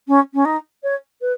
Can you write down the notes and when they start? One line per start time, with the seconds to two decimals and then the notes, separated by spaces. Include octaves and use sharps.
0.07 C#4
0.34 C#4
0.45 D#4
0.83 C#5
1.21 B4